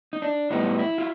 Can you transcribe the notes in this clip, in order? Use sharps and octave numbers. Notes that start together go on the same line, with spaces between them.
D#4
D4
A2 E3 G3 B3 D#4
E4
F4